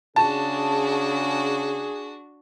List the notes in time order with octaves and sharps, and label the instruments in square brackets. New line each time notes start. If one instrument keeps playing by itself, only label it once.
[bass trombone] C#3 [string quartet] D4 F#4 [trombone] G#4 [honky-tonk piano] A5